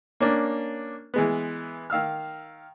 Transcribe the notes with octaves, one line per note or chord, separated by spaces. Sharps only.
A#3 C#4 D4
E3 G#3 B3
D#3 F5 E6 F6